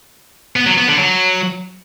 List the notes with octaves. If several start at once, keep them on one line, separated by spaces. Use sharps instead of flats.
B3
F#3
B3
D3
F#3